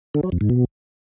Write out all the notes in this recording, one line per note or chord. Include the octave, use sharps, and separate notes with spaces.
D3
F#3
F2
G#2
B2